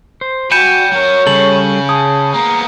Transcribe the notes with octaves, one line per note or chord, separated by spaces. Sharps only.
C5
F#4 G5 G#5 B5 G6 C#7 E7
F#3 A#4 C#5
C#3 G3 A4 F#7
G#4 A5 D#6
A#3 B3 A#5